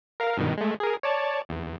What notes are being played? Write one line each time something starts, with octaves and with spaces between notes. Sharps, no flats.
A#4 F5
G2 B2 D#3
G#3 A3
G#4 A#4
C#5 D5 A5
E2